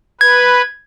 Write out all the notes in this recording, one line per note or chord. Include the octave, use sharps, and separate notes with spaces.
B4 G#6